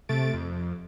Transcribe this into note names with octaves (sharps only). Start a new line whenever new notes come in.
C3 A3 A6 D7
F2